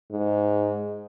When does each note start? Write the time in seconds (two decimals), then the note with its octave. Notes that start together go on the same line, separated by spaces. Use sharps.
0.12 G#2